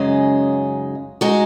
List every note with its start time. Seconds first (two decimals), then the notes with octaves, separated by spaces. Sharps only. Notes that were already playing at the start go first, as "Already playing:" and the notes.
Already playing: F#2 C#3 G#3 D#4
1.21 G#3 D#4 F#4